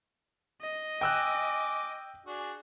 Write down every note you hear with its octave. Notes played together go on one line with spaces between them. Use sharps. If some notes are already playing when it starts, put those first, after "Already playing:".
D#5
G5 G#5 D6 E6 F#6
D4 F#4 G#4